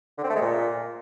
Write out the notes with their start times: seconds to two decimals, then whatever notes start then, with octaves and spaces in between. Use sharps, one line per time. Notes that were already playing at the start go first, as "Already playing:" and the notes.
0.18 D3
0.24 C4
0.30 A3
0.36 G#3
0.42 A#2